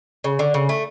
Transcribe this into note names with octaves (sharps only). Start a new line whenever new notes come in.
C#3
D3
C#3
A3